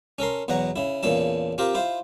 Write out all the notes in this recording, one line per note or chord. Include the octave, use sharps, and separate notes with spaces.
C#4 A4 A#4 C6
E2 B2 F#3 F#5 A#5
C#3 E4
E2 A#2 C#3 A4 A5
C4 F4 G4 A#4
E4 F4 C5